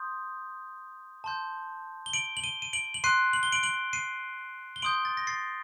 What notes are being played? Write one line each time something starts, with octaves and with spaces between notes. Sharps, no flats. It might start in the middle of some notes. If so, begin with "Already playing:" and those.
Already playing: C6 D#6 G6
A5 C6 G6
G7
D7 F#7
F#7
D#7 G7
D#7
D7 F#7
F#7
C6 F#6 C7 D#7
F#7
G7
D7 F#7
D7 F#7
C7 D#7
G7
C6 D#6 G6 D7 F#7
A6
A#6
A6 C7